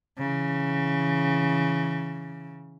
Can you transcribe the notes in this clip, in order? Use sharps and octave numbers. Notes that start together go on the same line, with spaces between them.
C#3 E3